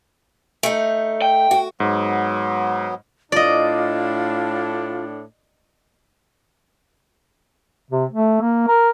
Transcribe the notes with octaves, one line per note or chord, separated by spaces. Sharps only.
A3 D#4
G5
F#4
G#2 F#3 B3
A2 D4 F4 D5 D#5
C3
A3
A#3
A#4